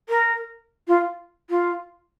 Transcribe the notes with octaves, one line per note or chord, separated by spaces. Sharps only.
A#4
F4
F4